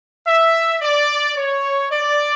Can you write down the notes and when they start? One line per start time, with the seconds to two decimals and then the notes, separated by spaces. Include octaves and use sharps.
0.27 E5
0.82 D5
1.37 C#5
1.92 D5